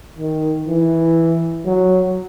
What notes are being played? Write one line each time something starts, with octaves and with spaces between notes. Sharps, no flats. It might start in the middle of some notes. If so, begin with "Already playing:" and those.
D#3
E3
F#3